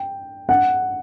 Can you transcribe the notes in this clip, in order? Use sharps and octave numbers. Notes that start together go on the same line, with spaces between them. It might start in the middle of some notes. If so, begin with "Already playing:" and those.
Already playing: G5
F#5